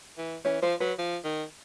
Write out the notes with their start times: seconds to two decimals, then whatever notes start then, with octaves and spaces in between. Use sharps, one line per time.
0.18 E3
0.45 E3 C#4 C#5
0.62 F3 C5
0.80 F#3 B4
0.98 F3
1.25 D#3